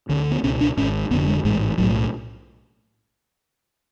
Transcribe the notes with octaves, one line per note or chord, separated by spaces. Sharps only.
D2 D3 C#4
B3
C#2 B2 C#4
D4
G#1 G#2 C#4
F1 F2 D3 B3
G#3
A1 G#2 G#3
B1 A2 F#3